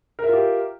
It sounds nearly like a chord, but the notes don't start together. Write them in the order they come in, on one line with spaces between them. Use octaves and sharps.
A#4 E5 F4 G4